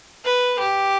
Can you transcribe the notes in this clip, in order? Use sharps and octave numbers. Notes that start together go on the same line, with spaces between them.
B4
G4